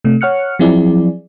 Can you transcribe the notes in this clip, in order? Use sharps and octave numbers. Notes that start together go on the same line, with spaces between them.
C3 A3
C#5 F#5 F6 F#6 C#7
F3 F#3 C4 E4 G#4 D5